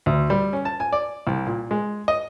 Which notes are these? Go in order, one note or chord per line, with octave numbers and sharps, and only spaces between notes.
D2
G3
C#4
A5
G#5
D5
C2
A#2
G#3
D#5